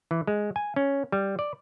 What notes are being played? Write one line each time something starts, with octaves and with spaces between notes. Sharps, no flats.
E3
G#3
G#5
C#4
G3
D5